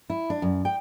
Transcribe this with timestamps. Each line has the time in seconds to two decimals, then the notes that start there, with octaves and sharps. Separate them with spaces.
0.10 E4
0.30 D4
0.42 F#2
0.65 G5